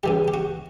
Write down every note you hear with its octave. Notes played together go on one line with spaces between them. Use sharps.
C#3 E3 G3 G4
G4
F#4